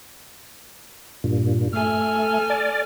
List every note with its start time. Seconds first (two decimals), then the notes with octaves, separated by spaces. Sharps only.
1.24 G2 A#2
1.73 A3 A4 G#5 F6
2.50 D5